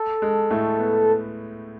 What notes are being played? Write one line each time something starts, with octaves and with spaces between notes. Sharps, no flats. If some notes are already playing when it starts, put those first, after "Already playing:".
Already playing: A4
G#3
A2 A3
B3